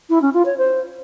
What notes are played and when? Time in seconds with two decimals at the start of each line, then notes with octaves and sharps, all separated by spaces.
0.09 E4
0.21 C#4
0.33 F4
0.45 C#5
0.57 C5